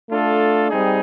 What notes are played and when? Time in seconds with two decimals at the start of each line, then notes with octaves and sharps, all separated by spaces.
0.10 A3 D4 F4 A4
0.69 G3 C4 D#4 G#4